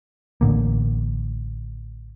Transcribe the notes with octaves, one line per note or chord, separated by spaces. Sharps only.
A1 A2 D3 A#3